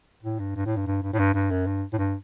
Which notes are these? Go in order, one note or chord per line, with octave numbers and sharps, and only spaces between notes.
A2
G2
G2
A2
G2
G2
G2
A2
G2
G2
F#2
G2
A2
G2